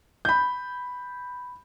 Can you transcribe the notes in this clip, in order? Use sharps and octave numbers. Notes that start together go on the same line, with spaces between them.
B5 G6